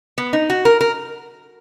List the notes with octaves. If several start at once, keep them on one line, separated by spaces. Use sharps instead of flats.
B3
D#4
F#4
A#4
A#4